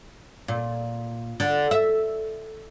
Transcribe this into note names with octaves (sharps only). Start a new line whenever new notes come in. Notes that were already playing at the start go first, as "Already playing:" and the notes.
A#2
D3
E5